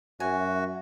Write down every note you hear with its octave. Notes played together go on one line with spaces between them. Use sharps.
F#2 F#4 E5 G#5